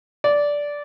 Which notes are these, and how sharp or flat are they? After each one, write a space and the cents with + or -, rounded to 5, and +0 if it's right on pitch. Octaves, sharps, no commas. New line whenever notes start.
D5 -10